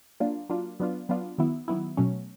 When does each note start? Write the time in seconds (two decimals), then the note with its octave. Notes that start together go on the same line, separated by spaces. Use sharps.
0.20 F#3 A#3 D4 F4
0.50 F#3 A#3 D4 F4
0.80 F#3 B3 D4 F4
1.09 F#3 B3 D4 F4
1.38 D#3 F#3 B3 E4
1.68 D#3 F#3 B3 E4
1.97 B2 F#3 A3 C#4